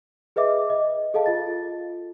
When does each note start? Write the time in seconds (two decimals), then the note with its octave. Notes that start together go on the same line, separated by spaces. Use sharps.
0.36 G#4 B4 D#5 E5 D6
0.70 D#5
1.14 G#4 A4 D#5 F5 A5
1.26 F4 A6